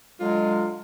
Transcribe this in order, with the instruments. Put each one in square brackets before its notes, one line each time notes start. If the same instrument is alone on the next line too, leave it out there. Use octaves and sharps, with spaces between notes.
[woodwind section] D3 F#3 G#3 [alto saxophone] F4